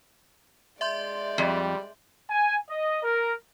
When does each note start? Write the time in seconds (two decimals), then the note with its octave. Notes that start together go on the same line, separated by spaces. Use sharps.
0.81 G#3 D5 E5 C6 G6
1.38 F2 G3
2.30 G#5
2.70 D#5
3.03 A#4